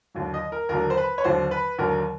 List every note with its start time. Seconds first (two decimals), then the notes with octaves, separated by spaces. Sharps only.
0.15 D#2 D3 F#3
0.34 D#5
0.52 A#4
0.69 D#2 D3 F#3 A#4
0.90 C5
0.97 B4
1.18 C#5
1.24 D#2 D3 F#3 C5
1.51 B4
1.79 D#2 D3 F#3 A#4